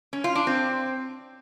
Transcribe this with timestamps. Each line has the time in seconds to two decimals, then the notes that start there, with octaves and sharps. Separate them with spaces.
0.13 C#4
0.24 F4
0.36 D4
0.47 C4